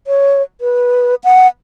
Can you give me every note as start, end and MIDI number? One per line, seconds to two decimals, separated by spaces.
0.07 0.42 73
0.61 1.15 71
1.24 1.47 78